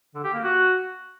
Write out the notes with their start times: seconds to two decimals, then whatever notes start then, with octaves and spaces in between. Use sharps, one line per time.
0.15 D3
0.24 G4
0.34 A#3
0.43 F#4